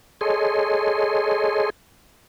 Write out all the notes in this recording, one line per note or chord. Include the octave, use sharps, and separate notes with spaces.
G#4 A4 C#5 D#5 C6